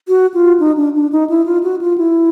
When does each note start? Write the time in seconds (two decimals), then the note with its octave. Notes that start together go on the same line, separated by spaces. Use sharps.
0.09 F#4
0.34 F4
0.60 D#4
0.77 D4
0.95 D4
1.12 D#4
1.30 E4
1.46 F4
1.63 F#4
1.81 F4
1.98 E4